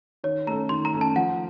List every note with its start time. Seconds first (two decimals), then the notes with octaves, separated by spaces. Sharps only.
0.24 D#3 C#5
0.47 A3 C#4 A4 A#5
0.69 D#3 C6
0.85 A#5
0.93 A3 C#4 A4
1.01 A5
1.16 F3 F#5